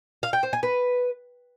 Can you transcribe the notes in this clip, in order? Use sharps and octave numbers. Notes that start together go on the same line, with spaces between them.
F5
G5
C5
G#5
B4